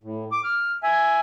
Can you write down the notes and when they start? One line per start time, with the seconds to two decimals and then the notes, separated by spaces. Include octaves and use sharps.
0.03 A2
0.32 D6
0.44 F6
0.83 E5 G#5